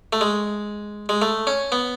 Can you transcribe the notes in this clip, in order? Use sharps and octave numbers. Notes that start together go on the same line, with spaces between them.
A3
G#3
G#3
A3
C#4
B3